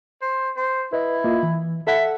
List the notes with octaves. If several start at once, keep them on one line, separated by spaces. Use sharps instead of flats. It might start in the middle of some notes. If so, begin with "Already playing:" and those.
C5
C5
E4 B4 D#5
A#3 F4 D#5
E3
A4 E5 F#5